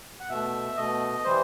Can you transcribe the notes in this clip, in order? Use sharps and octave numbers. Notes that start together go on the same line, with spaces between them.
F#5
B2 A3 E5
B2 A3 D#5
E3 G3 C5